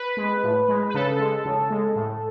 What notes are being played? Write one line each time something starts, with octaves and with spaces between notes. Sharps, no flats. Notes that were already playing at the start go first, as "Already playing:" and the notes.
Already playing: B4
G#3
A2
G#3
B4
C#3 A4
G#3
C#3
G#3
A2